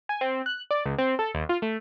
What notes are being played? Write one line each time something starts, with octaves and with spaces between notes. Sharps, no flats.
G#5
C4
F#6
D5
C#2
C4
A4
D#2
F4
A3